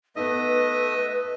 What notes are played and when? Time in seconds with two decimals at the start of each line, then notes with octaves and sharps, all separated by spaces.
0.16 A3 B3 D#4 B4 D#5 E5